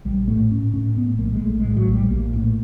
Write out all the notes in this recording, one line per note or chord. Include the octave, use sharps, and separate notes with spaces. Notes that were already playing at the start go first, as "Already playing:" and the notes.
A#1 G3
A2 A3
A2 C#4
A2 C#4
A2 B3
A#1 A#3
G#3
A#1 A3
G#3
A2
F#3
A#1
G3
A#1 A#3
A2